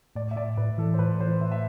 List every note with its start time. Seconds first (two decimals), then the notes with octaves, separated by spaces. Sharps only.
0.15 A2 D5
0.31 E5
0.36 A2 D5
0.57 A2 B4
0.78 E3 A4
0.94 C5
0.99 A2 B4
1.20 E3 C5
1.41 A2 E5
1.52 E5